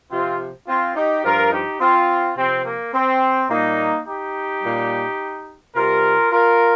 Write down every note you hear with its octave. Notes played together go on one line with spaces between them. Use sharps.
C3 F3 C4 F4
C4 F4
D#4 G4
G2 F3 F4 A#4
D#4 G4
C4 F4
C3 F3 C4
A#3
C4
A#2 G3 A#3 D#4
D#4 G4
A#2 G3
C3 G3 F4 A#4
F4 A#4